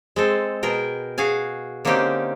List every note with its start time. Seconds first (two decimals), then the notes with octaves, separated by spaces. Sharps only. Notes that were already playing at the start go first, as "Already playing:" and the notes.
0.16 G#3 C4 A4
0.63 B2 G#4 A#4 G5
1.18 F#4 G#4 F5 G#5
1.85 D3 A#3 C4 C#4 D#4 G4